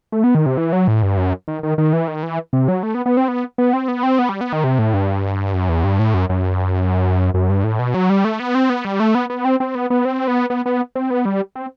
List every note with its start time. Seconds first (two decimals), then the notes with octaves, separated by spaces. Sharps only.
0.12 A3
0.24 B3
0.35 D#3
0.46 C3
0.57 E3
0.73 F#3
0.88 A2
1.03 G2
1.17 F#2
1.48 D#3
1.63 D#3
1.78 D#3
1.93 E3
2.08 D#3
2.23 E3
2.53 C3
2.68 F#3
2.83 A3
2.95 B3
3.06 B3
3.17 C4
3.28 B3
3.58 B3
3.73 C4
3.88 B3
4.03 C4
4.19 B3
4.29 G3
4.41 B3
4.53 D#3
4.64 C3
4.79 A2
4.94 G2
5.54 F#2
5.69 E2
5.84 G2
5.99 A2
6.14 F#2
6.29 F#2
7.34 F#2
7.50 G2
7.64 A2
7.79 B2
7.94 F#3
8.10 G3
8.25 A3
8.40 B3
8.55 C4
8.70 B3
8.85 G3
9.00 A3
9.15 B3
9.30 B3
9.45 C4
9.60 C4
9.75 B3
9.90 B3
10.05 C4
10.28 B3
10.50 B3
10.66 B3
10.95 C4
11.10 B3
11.25 G3
11.55 C4